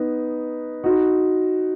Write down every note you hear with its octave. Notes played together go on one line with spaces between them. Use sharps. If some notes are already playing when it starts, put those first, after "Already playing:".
Already playing: B3 D#4
D#4 F#4